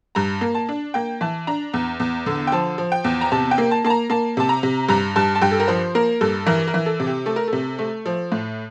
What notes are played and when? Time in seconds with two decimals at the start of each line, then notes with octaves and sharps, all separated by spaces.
0.15 G2 A#5
0.41 A#3
0.55 A5
0.69 D4
0.94 A#3 G5
1.21 E3 A5
1.47 D4 A#5
1.73 E2
2.00 E2
2.26 D3
2.47 G5
2.52 F3 A5
2.78 F3
2.92 G5
3.04 E2
3.21 A#5
3.32 C3 A5
3.51 G5
3.58 A#3
3.71 A5
3.84 A#3 A5
3.90 A#5
4.10 A#3 A5
4.37 C3 A5
4.49 A#5
4.63 C3
4.89 G2 A#5
5.16 G2 A5
5.35 A5
5.42 G2 G5
5.51 A4
5.60 A#4
5.68 F3 C5
5.95 A#3 A#4
6.21 G2 A4
6.46 E3 A#4
6.67 A#4
6.74 E3
6.86 A4
7.00 C3
7.07 G4
7.26 A3 A4
7.36 A#4
7.48 A4
7.53 C3
7.79 A3
8.06 F3
8.32 A2